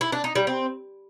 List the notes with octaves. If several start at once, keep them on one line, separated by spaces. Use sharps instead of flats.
E4
D4
D#4
G3
C4